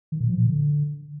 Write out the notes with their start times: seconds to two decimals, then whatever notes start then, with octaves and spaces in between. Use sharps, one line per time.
0.12 D#3
0.21 A#2
0.29 F3
0.38 A#2
0.46 D3